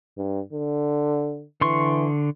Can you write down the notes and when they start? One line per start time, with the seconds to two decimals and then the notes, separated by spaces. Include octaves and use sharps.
0.17 G2
0.53 D3
1.61 D3 E3 C6 C#6